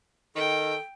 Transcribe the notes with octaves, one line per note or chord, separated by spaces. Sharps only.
D#3 A4 G5